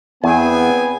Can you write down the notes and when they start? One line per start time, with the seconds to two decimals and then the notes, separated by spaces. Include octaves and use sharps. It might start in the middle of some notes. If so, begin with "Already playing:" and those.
0.24 E2 B3 C4 G#4 G#5